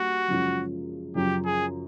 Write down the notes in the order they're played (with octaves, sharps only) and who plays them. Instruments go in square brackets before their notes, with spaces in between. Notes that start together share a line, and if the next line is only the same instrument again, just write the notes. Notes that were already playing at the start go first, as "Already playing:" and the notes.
Already playing: [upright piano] G3 A#3 D4 [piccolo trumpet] F#4
[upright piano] F#2 C#3 F3 G#3 C#4
[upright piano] F#2 C#3 F3 [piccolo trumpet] G4
[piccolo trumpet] G#4